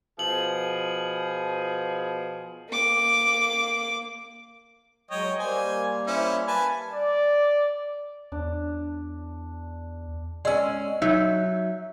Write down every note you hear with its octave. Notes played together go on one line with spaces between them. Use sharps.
B2 F3 G#4 F#7
A#3 D6
F#3 G#3 C#5 D#5 G5
G3 A#3 C5 G#5
C#4 E4 C5
B4 G#5 A5
D5
E2 D4
G#3 C#4 D5 E6
F#3 D#4 E5